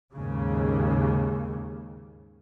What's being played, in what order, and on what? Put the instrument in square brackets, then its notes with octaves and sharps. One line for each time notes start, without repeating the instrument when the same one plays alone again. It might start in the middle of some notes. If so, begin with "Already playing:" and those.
[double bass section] D#2 G#2 C#3